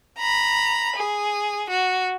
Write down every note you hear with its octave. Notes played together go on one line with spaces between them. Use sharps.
A#5 B5
G#4
F#4